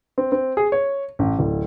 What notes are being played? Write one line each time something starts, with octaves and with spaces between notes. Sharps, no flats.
C4
C4
G#4
C#5
A1
D1